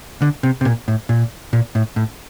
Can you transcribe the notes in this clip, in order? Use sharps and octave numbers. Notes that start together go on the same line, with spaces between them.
D3
C3
C3
A#2
A2
A#2
A#2
A2
A2